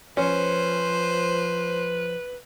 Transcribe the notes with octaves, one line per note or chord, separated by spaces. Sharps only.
F3 C#4 B4 C5